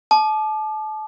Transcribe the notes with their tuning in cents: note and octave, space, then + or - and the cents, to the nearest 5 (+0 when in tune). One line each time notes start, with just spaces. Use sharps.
A5 -30 D6 +35